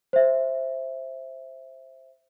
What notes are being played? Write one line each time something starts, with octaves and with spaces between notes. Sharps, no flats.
C5 E5